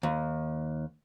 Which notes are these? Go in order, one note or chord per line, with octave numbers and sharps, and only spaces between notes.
D#2